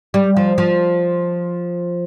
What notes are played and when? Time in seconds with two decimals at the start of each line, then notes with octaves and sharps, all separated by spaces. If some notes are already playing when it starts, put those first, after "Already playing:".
0.14 G3
0.36 F3
0.58 F3